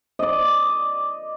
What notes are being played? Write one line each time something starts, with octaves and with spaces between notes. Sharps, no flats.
D5 D#5